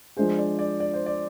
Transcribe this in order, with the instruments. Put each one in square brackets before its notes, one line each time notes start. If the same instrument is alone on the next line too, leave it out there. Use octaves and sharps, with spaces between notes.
[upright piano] F3 G#3 D4 G#4 [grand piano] C5
[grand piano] D5
D5
D5
C5
D5